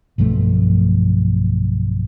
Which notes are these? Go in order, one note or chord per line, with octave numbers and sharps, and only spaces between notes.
B1 G2 F3 A3